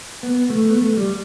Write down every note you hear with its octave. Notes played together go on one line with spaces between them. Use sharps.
B3
A3
B3
A3
G3